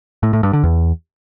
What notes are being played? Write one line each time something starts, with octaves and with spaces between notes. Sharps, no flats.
A2
A2
G2
D3
E2